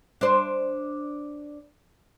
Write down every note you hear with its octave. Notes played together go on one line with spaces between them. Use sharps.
D4 C5